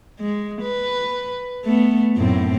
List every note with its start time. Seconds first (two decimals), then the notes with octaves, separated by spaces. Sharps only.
0.20 G#3
0.62 B4
1.65 A3 B3
2.17 F#2 A2 C4